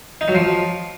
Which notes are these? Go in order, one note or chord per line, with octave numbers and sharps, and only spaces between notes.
D#4
F#3
F3